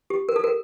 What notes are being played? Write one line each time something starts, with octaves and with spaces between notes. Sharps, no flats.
G4
A#4
A4
A#4